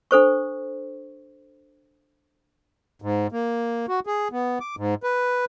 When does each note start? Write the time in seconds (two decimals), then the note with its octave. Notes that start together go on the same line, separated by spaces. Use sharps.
0.11 D4 A4 C5 C#6
3.02 G#2
3.32 A#3
3.88 F#4
4.07 G#4
4.32 B3
4.61 D6
4.77 G#2
5.03 B4